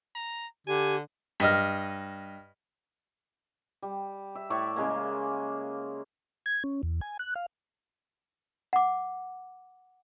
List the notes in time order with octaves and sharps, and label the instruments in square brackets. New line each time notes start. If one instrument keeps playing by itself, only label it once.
[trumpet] A#5
[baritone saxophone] D3 [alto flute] G4 [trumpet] G#5
[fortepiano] G2 D#5 F6
[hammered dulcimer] G3
E5
A2 D5 E5 C#6
C#3 G#3 A#3
[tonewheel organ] G#6
C#4
E2
G#5
F#6
F5
[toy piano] F#5 D6